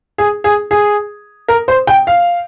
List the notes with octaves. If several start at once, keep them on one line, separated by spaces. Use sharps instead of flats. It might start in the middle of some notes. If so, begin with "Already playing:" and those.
G#4
G#4
G#4
A#4
C5
G5
F5